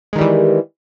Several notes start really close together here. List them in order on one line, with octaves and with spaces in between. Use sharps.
G#3 D#3 G3 E3